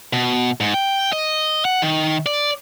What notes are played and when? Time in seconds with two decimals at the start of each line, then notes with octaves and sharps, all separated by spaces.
0.13 B2
0.61 G#2
0.74 G5
1.13 D#5
1.65 F#5
1.82 D#3
2.26 D5